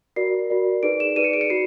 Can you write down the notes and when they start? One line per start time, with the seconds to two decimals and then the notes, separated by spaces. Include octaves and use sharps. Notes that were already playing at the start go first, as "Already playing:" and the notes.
0.16 F#4 A#4 D5 C7
0.50 F#4 A#4 D5
0.83 D#4 G#4 B4 D5 D7
1.00 E7
1.16 D#4 G#4 B4 D5 D#7
1.24 C#7
1.33 D7
1.41 C#7
1.50 F#4 C7